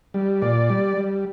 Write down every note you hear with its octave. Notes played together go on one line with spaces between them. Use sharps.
G3
A#2 D5
G3
G3